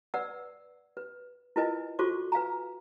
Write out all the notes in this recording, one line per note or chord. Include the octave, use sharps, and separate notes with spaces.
B4 D5 F#5 E6
B4
E4 F4 A#4 B4 D#5 G#5
F4 F#4 A4 C5 C#6 D6
B4 F5 G#5 A#5